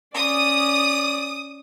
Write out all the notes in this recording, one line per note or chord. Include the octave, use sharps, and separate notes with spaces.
C#4 D5 D#6